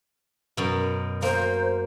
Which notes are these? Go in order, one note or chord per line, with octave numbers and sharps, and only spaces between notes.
F#2 B2
A#3 C5